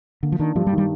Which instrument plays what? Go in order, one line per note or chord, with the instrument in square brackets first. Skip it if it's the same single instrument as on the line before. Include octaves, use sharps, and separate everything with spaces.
[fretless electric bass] D3 [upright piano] A#3
[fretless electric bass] F3
[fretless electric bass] D#3 [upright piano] D4
[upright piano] G2 [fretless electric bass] F3
[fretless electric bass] G3
[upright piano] D#3
[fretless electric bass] G3